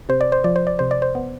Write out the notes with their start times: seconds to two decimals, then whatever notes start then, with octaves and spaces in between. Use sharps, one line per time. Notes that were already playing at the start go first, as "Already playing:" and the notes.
0.09 C3 C5
0.21 D5
0.32 C5
0.44 F3 D5
0.56 C5
0.67 D5
0.79 C3 C5
0.91 D5
1.02 C5
1.15 B3